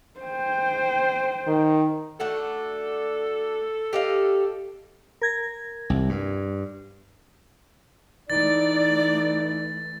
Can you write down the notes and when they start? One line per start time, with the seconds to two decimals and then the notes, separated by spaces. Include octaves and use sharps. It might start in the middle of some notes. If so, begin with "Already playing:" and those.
0.20 C5 G5
1.47 D#3
2.20 A3 D4 F#4 A4
3.93 G4 D#5 F5
5.22 A#4 G#6 A#6
5.90 C2
6.09 G2
8.30 E3 A3 D#4 D5 A6